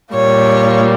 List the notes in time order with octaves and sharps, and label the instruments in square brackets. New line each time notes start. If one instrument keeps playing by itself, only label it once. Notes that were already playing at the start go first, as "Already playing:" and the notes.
[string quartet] A#2 G3 A#3 C#5